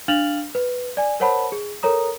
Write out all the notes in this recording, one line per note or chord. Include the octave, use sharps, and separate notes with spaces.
D4 F5 F6 A6 F7 F#7
B4
D5 G#5
A#4 C5 C#5 F#5 A5 B5
G#4
A4 A#4 C#5 A#5 D#6